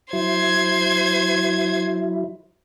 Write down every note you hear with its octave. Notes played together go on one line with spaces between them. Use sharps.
F#3 E4 C5 G#6